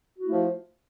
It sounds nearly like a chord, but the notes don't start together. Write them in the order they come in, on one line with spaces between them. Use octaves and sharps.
F#4 E4 A3 F3